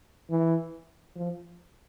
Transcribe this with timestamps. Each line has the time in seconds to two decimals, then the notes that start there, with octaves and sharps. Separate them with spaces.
0.30 E3
1.16 F3